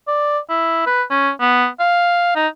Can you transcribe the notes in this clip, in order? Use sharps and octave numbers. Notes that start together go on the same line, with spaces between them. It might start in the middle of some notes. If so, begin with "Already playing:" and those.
D5
E4
B4
C#4
B3
F5
D#4